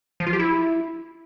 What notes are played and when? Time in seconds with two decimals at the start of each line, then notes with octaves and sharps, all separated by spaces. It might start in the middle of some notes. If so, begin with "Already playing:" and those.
0.20 F3
0.27 F4
0.33 G4
0.39 E4